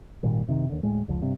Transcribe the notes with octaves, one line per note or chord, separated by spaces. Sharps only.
G#1 A#2 D#3 G3
F#1 C3 D#3
D#2 D3
D1 A2 G#3
F1 C#2 F3
G2 C3